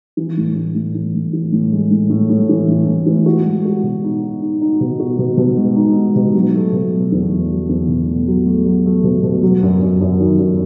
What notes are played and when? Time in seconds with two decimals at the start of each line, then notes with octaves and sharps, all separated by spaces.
0.17 E3
0.37 A2
0.56 A2
0.75 A2
0.95 E3
1.15 A2
1.33 E3
1.52 A2
1.72 G#3
1.91 A2
2.10 A2
2.30 A2
2.49 E3
2.68 A2
2.88 A2
3.06 E3
3.26 F#4
3.46 G#3
3.65 F#4
3.83 B2
4.04 D#4
4.23 D#4
4.42 D#4
4.62 D#4
4.81 B2
4.99 F#4
5.19 B2
5.37 B2
5.57 G#3
5.76 D#4
5.96 G#3
6.16 B2
6.34 F#3
6.54 A3
6.72 B2
6.93 F#3
7.12 E2
7.31 F#3
7.51 F#3
7.69 E2
7.88 B2
8.08 A3
8.28 F#3
8.46 A3
8.65 F#3
8.86 A3
9.04 B2
9.23 B2
9.43 F#3
9.62 F#2
9.81 F#2
10.01 F#2
10.20 D#3
10.39 F#2